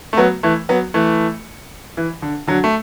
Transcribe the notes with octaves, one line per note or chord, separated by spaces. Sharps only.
A3
F#3 B3
E3 A3
F#3 B3
E3 A3
E3
D3
D3 F#3
A3